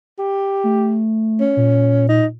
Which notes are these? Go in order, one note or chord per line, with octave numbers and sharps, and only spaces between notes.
G4
A3
C#4
A#2
D#4